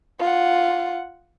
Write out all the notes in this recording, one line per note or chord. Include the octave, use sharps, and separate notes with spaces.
F4 F#5